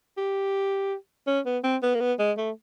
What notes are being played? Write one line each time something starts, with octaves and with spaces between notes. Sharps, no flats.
G4
C#4
B3
C4
B3
A#3
B3
G#3
A3